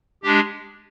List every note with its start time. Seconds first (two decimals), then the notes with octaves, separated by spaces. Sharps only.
0.23 G#3 D4 G4